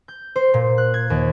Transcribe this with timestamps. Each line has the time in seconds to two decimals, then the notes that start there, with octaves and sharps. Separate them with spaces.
0.08 G6
0.36 C5
0.54 A#2
0.78 F#6
0.94 G#6
1.10 D#2